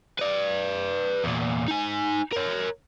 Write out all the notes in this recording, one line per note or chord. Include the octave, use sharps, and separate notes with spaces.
B4 D5
E2 A#2
D#4 G#5
A#4 C#5